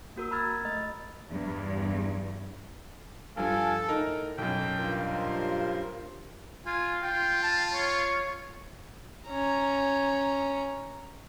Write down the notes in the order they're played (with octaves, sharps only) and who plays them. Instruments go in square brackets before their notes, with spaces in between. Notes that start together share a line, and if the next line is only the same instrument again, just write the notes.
[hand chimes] A#3 F#4 A#4 E6
A#5 B5 E6 F6 G#6 A6
A3 D#5 A6
[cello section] E2 G2
[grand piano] G2 F3 [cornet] A4 [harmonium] F5 G#5
[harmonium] A2 [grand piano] D#4 A#4
[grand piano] B1 F#2 [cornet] G5
[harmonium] G2 F4 A#4
[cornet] C5
[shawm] F4 [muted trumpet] G#5
[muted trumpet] F4 [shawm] G5
[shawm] A5
C#5
[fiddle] C#4 A#5